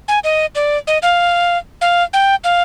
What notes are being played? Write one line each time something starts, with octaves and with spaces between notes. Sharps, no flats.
G#5
D#5
D5
D#5
F5
F5
G5
F5